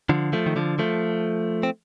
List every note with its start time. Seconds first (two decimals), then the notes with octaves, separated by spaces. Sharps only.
0.09 D3 F3
0.33 F3 A3
0.46 D#3
0.56 D3 F3
0.79 F3 A3
1.63 C4